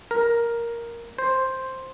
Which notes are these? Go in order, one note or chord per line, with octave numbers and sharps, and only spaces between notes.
A#4
C5